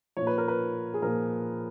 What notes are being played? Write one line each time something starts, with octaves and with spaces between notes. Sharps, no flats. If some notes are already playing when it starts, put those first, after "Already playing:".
A#2 F3 C#5
B4
A#4
B4
G#4
A#2 F3 A#4